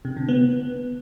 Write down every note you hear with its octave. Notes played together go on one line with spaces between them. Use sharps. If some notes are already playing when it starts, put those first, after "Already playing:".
C3
D3
B3